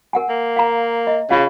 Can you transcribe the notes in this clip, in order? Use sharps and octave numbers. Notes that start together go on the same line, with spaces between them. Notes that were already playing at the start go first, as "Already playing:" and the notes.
A#4 F#5 G#5
A#3
F5 A#5
D#5
C#3 F4 G#4 F5